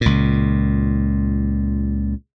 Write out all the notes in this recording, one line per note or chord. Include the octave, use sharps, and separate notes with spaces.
C#2 A#2